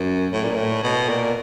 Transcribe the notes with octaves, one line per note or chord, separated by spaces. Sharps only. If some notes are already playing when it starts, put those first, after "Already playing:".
Already playing: F#2
A2
A#2
A2
B2
A#2